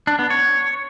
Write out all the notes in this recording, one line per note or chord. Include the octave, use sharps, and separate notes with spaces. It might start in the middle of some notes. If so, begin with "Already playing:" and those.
D4
B3
C#5